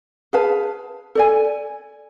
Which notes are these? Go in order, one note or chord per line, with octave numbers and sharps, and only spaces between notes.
G#4 B4 F5 A5
A4 D5 G#5